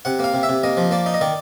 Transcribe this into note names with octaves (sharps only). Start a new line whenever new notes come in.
C3 F#5
A#3 F5
C3
E5
C3
A#3 D#5
F3
A#3 D5
D#4
D#5
D#3 D5